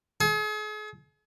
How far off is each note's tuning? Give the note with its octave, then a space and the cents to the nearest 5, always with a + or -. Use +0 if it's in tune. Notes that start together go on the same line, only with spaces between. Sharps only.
G#4 +40